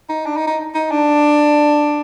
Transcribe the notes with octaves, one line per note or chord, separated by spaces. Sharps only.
D#4
D4
D#4
D#4
D#4
D4